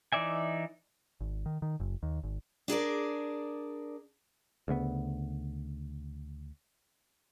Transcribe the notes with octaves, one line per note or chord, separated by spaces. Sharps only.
E3 D#4 D5 E5 G#5
G#1
D#3
D#3
F#1
D#2
G#1
D4 G#4 A#4 D5
D2 C#3 A#3 B3